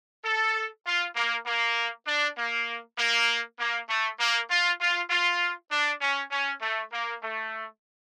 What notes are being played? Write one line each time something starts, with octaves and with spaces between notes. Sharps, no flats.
A4
F4
A#3
A#3
D4
A#3
A#3
A#3
A3
A#3
F4
F4
F4
D4
C#4
C#4
A3
A#3
A3